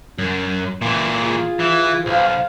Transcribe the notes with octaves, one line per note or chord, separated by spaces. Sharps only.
F#2
A#2 E3
F4 G#4
E3
B1 C5 F5